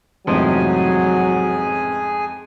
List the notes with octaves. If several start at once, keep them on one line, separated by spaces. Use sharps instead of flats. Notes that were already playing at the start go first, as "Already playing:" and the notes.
A1 F2 G#2 C3 F3 F#3 G#4 G#5